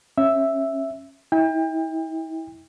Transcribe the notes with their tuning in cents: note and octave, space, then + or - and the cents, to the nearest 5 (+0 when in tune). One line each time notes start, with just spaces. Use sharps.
C#4 -25 E5 +0
E4 -40 G5 +35